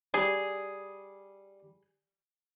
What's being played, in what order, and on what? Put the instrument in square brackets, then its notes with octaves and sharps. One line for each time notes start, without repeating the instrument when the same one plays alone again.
[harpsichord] G3 [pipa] G#4